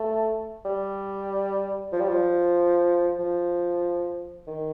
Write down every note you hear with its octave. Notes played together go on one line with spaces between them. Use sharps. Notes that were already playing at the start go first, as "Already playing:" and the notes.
Already playing: A3
G3
F3
G3
F3
F3
D#3